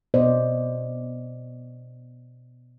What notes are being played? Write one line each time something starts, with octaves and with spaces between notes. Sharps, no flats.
B2 C5 D5 D#5